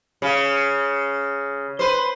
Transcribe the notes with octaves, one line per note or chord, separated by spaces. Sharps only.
C#3
B4 C5